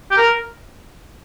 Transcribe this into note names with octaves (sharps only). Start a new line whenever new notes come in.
G4
A#4